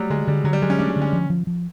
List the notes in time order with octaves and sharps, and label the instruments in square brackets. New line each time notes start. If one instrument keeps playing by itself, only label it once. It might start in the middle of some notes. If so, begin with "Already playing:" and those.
Already playing: [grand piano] F#3 G3 [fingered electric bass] A3
[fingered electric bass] D3 [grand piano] G#3
[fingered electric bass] D3 [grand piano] G3
[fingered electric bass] D3 [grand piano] F#3
[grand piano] G3
[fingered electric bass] F#3 [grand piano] G#3
[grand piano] C#4
[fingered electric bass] A3 [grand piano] D4
[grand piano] C#4
[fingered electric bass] D3
[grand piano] C#4
[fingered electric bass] F3
F3
F3